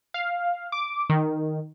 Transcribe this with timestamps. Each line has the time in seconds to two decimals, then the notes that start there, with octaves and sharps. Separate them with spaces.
0.14 F5
0.72 D6
1.10 D#3